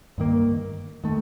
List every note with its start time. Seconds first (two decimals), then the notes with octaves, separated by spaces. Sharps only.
0.18 G2 D#3 A#3
1.04 D#3 A3